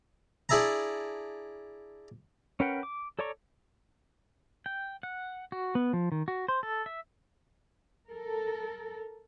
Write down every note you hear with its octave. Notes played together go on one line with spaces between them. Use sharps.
D4 E4 G#4 E5 A5 A#5
C#4 A#4 B4 F#5 G5
D6
A4 C#5 D5 A#5 C#6
G5
F#5
F#4
B3
F3
D#3
F#4
C5
A4
E5
A4 A#4